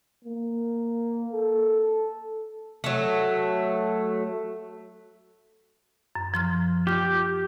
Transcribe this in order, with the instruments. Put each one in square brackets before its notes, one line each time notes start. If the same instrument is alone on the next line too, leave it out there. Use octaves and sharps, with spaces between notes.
[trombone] A#3
A4
[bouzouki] F#3 A3
[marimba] F#2
F3 C6 F6
[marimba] F4 F6 [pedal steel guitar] G4